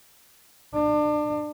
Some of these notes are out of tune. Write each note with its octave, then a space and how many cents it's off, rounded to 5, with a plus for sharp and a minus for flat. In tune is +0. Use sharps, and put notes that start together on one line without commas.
D4 +30